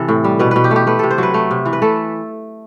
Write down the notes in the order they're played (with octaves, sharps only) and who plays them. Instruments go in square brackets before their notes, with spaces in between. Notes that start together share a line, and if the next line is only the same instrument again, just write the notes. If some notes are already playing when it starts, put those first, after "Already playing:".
Already playing: [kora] C3 E3 A4
A2
G3
B2 B4
B2 B4
G4
A3
G4
A3 B4
C3 A4
C5
F#3 B4
A3
C3
E3
B4
A3 A4